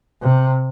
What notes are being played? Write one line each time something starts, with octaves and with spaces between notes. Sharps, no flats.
C3